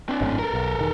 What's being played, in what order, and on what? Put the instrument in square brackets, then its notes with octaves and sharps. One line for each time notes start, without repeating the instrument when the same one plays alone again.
[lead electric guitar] C4 D4
[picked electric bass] G#1 F#2 A2
[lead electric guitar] A4 A#4
[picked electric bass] B1
E1 D#3